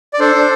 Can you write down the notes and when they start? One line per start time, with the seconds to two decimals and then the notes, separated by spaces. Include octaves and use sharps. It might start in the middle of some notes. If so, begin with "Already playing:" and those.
0.13 D5
0.20 D4 A4 C5
0.35 D4